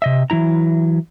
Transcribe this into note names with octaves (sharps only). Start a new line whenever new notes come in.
C3 D#5 E5
E3 F#3 E4 A#5